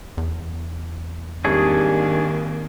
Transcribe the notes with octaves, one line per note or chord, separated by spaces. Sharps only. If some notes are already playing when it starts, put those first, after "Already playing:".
E2
G#1 D#3 G3 A#3 D4 G#4 C#5